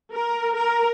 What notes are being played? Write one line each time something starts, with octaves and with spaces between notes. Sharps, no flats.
A#4
A#4